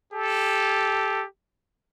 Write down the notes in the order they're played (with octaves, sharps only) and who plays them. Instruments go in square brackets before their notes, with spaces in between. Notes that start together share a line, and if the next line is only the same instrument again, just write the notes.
[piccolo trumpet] G4 [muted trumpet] A4